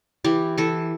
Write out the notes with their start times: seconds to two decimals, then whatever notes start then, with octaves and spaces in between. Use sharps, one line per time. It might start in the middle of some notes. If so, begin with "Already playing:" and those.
0.24 E3 G4
0.58 E3 A4